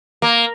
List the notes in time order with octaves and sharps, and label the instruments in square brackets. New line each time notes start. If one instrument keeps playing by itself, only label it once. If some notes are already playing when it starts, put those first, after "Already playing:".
[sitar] A#3